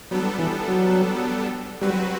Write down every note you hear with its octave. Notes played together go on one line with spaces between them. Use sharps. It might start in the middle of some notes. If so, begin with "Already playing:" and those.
F#3 G3 B3 D4 A4
E3
F#3
F#3 G3 C4 F#4 B4